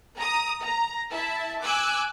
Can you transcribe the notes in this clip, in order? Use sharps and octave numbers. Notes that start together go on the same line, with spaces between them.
A#5 D#6
A#5
E4 E5 A5
G#5 D6 E6 F#6